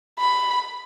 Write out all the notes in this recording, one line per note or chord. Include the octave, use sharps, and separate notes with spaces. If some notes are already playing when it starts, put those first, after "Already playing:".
B5